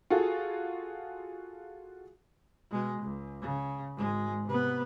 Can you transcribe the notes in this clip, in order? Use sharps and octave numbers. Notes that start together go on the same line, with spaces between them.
F4 F#4 G#4 A4
B2 G#3
C#2
C#3
G#1 G#3
C3 B3